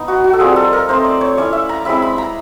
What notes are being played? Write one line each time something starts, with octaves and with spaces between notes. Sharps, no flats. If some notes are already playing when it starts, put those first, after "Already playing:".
Already playing: B3 D#4
F#4
F#4
A4
G3 C4 F4 G#4
A4
A#4
A3 C4 D#4 C5
D5
C#5
A3 C#4 E4 D5
E5
A#5
G#3 C4 E4 B5
B5
A#5